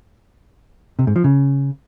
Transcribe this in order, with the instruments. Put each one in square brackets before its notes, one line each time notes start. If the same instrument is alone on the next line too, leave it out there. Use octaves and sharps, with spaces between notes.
[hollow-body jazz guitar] C3
G#2
F3
C#3